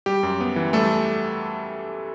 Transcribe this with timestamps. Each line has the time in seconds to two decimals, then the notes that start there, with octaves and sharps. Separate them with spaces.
0.06 G3 G4
0.23 F#2
0.40 B3
0.56 E3
0.73 G3 A3 A4